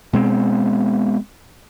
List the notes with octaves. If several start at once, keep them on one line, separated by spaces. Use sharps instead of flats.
B2 G#3 C4